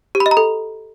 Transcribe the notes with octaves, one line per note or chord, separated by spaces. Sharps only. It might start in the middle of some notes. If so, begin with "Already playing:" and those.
G4
B5
D#5
A#5
A4